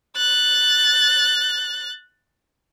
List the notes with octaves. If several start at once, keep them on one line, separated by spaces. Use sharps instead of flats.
F#6 A6